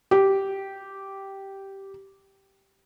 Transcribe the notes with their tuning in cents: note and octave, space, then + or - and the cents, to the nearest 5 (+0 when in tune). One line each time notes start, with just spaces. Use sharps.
G4 -10